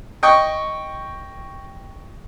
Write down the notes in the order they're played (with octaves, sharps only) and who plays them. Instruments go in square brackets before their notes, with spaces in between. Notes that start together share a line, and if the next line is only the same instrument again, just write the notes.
[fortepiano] D#5 G5 C#6